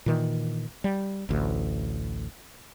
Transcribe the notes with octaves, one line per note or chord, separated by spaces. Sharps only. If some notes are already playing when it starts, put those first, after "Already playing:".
A#2 D#3 E3
G3
A1 D2